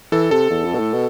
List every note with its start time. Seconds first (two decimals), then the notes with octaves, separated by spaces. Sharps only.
0.12 E3 A4
0.31 C3 A4
0.50 E2
0.64 F2
0.74 B2
0.79 A2
0.94 B2